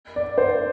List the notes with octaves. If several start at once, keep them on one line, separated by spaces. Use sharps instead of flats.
D5
C5